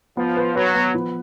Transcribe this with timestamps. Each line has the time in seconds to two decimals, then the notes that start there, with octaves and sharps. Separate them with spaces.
0.17 F3 B3
0.37 B4
0.56 F#3 B4
0.75 B3
0.94 F3